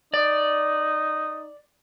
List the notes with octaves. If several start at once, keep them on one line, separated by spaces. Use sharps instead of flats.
D#4 D5